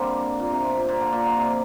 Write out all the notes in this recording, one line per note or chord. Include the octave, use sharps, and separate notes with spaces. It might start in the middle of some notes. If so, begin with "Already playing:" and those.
Already playing: D3 G3 A#3 C4 D4
A#2
C3
C3
A#2
A#2
D3
A#2
D3
C3